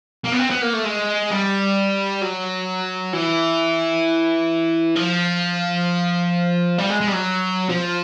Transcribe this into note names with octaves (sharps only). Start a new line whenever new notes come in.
A#3
B3
C4
B3
A#3
A3
G#3
G3
F#3
E3
F3
G3
G#3
G#3
G3
F#3
F3